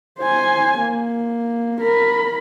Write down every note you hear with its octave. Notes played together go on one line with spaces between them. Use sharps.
C5 G#5
A#3
A#4 B5